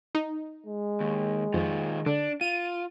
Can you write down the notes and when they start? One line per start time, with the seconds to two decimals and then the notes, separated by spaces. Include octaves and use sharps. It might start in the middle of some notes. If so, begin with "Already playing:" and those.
0.15 D#4
0.66 G#3
1.00 D#2
1.54 F2 D#3 F4
2.06 D3 D4
2.41 F4 D#7